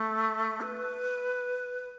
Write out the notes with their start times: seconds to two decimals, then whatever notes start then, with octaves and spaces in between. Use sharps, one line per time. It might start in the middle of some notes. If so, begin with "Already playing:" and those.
Already playing: A3
0.61 B4